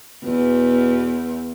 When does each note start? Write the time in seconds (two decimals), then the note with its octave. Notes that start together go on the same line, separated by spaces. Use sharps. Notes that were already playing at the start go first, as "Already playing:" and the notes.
0.24 E2 B2